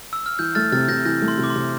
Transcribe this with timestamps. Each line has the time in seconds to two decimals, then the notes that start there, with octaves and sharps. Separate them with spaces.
0.13 E6
0.26 F6
0.39 E3 G6
0.55 A3 F6 A6
0.72 C3 F6 A6
0.88 C3 G6 A#6
1.05 E3 G6 A#6
1.22 A3
1.28 C6
1.38 C3
1.44 D6
1.50 C6
1.56 C3